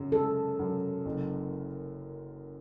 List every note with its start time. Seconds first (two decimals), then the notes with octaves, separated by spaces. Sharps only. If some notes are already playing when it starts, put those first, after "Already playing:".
Already playing: F#2 C#3
0.12 G#3 A4
0.59 F#2
1.05 F#1